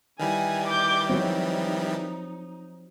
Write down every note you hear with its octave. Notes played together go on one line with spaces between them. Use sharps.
D#3 E3 G3 G#5
D6 G6
F3 F#3 C4 D#4